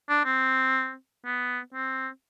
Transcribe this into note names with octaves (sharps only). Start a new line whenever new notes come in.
D4
C4
B3
C4